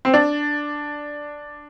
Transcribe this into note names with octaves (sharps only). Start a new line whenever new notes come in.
C4
D4